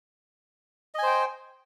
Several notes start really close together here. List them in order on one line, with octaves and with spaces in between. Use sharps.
D#5 G#5 C5 G5